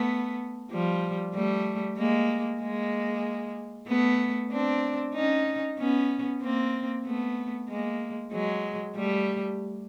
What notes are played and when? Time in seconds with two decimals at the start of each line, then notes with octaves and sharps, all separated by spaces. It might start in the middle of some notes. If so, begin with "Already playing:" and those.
Already playing: A3 B3
0.71 F3 G3
1.34 G3 A3
1.98 G#3 A#3
2.61 G#3 A#3
3.88 A3 B3
4.51 C4 D4
5.15 C#4 D#4
5.79 B3 C#4
6.42 A#3 C4
7.05 A3 B3
7.69 G#3 A#3
8.32 F#3 G#3
8.96 G3 A3